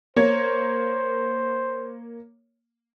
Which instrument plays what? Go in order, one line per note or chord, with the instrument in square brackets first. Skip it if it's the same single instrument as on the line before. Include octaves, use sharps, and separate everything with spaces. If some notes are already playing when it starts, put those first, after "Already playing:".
[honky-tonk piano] A#3 C#5 [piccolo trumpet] C5